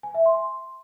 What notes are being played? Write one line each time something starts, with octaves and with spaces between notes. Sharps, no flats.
G#5
E5
C6